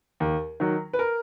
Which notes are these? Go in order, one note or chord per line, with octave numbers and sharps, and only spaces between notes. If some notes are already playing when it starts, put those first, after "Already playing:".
D#2
D#3 F#3
B4
A#4